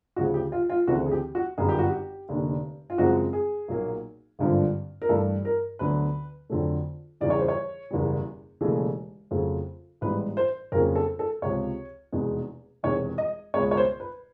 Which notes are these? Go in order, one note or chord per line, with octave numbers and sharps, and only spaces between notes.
D2 C#3 F3 F#4
G4
F4
F4
D2 C#3 E3 A3 C4 F#4
G#4
G4
F#4
G1 F#2 D#3 G3 B3 G#4
G4
F#4
G4
F1 D#2 D3
F4
F#2 C#3 F3 G#3 C4 F#4
G#4
B1 A#2 F#3 A#3
G#1 G2 D3 F3
A#4
G2 E3 A3 A4
A#4
D2 D3 F#3 B3 B4
F2 D3 F#3 A3
E2 C#3 E3 G3 D5
C#5
C5
C#5
F#1 E2 B2 G3
E1 D#2 C#3 E3 A3
F2 C#3 F#3 A3
A1 G#2 E3 G3 B3 B4
C5
F2 C#3 F#3 A#3 C#4 A#4
A4
A4
C#2 C3 F3 C#5
F1 E2 B2 G#3
E1 E2 C3 D#3 C#5
D#5
C#2 B2 G#3 B3 C#5
C#5
C5
B4